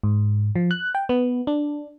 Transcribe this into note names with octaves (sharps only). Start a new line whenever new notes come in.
G#2
F3
F#6
G5
B3
D4